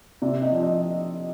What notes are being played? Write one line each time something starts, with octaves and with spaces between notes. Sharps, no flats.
C3 D5
D#5
F3
D#5